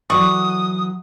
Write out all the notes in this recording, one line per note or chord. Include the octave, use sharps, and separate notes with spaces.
E3 F#3 D5 F#5 C#6 D#6